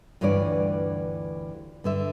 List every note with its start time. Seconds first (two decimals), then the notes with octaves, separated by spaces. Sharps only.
0.21 D2 G2 E3 F4 C#5 D5
1.84 G2 D3 E5